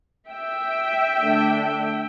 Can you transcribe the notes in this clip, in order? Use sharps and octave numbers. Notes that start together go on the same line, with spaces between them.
E5 G5
D3 A3 D4